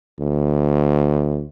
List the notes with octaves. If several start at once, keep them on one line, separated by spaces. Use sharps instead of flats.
D2